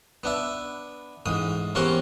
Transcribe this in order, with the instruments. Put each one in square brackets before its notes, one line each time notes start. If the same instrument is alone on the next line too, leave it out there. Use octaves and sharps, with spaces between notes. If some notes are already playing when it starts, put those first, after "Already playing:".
[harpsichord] B3 D4 E5
A1 G#2 D#6
E2 C4 C#4 G4 A#4 F#5